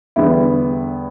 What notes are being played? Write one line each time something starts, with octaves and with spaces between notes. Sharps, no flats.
E2 D3 G3 B3 E4